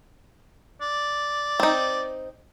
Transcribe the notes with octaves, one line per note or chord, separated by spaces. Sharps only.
D5
C4 D#4